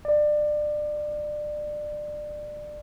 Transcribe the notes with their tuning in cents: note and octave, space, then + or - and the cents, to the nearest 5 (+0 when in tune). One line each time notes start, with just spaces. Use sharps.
D5 +25